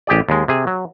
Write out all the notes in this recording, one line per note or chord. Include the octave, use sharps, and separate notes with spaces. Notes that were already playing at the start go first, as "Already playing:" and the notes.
A1 G4 G#4 D5
D#2 G#3
C3 G#4
F#3